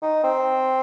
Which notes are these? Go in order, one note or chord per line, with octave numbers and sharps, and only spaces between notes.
D#4
C4